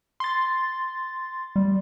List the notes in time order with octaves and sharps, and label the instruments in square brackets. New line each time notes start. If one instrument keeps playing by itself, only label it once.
[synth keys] C6 A6
[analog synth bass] G3